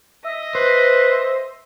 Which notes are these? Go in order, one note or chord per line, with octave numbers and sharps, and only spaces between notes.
D#5 E5
B4 C5